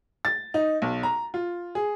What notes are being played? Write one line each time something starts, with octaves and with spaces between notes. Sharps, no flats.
A6
D#4
B1
A#5
F4
G#4